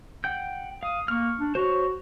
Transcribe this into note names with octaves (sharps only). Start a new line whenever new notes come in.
F#5 G5 G6
F5 D#6
A#3 C#6 F6
D4
F#4 C5 C#5